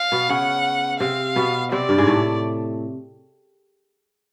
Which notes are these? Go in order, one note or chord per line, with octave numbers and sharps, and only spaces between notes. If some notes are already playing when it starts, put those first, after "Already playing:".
Already playing: F5
B2 B3
C#3 C#4 F#5
C3 C4 F5
B2 B3
C3 C4 D5
G2 G3
G#2 G#3
A2 A3